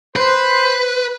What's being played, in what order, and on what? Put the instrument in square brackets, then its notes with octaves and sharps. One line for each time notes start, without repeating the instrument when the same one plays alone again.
[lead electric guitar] B4 [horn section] C5